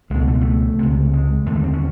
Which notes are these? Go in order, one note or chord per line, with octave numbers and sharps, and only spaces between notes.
C#2 B2 G#3
A3
G#3
A3
C#2 C3
G#3
D#2 D3 G#3
G3
C4
C#4